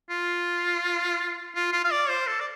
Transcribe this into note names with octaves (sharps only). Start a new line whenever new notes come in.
F4
F4
F4
F5
D5
C5
A4
D5